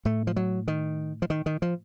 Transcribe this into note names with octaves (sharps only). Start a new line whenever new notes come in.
A2 A3
F3
F#3
D#3
F3
D#3
D#3
F3